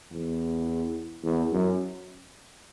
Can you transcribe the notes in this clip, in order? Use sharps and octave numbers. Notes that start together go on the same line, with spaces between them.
E2
E2
F#2